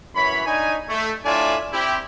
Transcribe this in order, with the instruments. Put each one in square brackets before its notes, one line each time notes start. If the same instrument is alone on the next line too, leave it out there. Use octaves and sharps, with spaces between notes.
[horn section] F#2 E3 C#5 B5
D4 D#4 C#5 G#5
A3
A2 D4 F4 D5 E5 G#5
C4 E4 G4